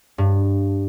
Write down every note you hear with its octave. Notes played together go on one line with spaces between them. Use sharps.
G2